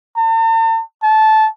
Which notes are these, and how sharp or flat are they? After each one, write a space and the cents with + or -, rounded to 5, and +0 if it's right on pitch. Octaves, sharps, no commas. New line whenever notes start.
A5 +45
A5 -15